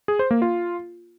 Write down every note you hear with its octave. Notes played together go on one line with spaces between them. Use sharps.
G#4
C5
A#3
F4